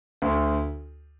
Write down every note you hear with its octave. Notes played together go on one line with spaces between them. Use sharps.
D2